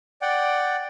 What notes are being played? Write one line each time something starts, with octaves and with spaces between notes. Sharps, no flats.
D5 F#5 G5